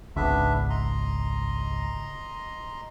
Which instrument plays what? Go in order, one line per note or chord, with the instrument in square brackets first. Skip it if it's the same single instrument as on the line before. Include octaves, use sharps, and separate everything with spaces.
[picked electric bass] G#1 C#2 [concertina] B3 D4 E5
[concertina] D#5 A#5 C6